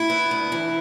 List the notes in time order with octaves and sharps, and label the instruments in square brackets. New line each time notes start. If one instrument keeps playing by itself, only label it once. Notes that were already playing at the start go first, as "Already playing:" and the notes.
Already playing: [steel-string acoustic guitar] E4
B3
D2
E3